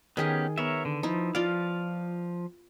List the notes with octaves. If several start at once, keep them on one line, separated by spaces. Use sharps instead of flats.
D#3 B3 C#4 G4 G#4 D#5
B3 A#4 C#5 E5
D3
F3 D#4 E4
F3 F4 D5 F5